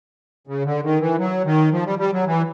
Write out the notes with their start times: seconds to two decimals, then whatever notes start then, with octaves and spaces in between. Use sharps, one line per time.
0.47 C#3
0.65 D3
0.83 D#3
1.00 E3
1.18 F#3
1.45 D#3
1.72 F3
1.85 G3
1.99 G3
2.12 F#3
2.26 E3